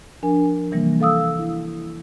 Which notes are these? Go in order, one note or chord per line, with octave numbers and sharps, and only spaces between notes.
F3 D4 A#4 G#5
C3 E3 G3 A#3
A4 F5 D#6 E6
E4